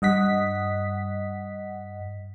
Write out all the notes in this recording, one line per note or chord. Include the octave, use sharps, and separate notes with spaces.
G2 D#5 F#5 B6